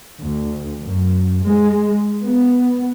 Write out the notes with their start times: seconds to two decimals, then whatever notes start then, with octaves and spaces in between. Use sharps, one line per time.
0.20 D2
0.82 F#2
1.44 G#3
2.23 B3